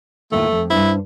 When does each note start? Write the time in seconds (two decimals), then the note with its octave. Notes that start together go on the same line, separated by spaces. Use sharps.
0.32 D#2 A2 A3 F4
0.52 F2
0.70 G2 D4 E4 C5